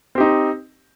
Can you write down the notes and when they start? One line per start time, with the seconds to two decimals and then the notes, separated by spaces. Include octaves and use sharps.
0.15 C4
0.18 G4
0.20 D#4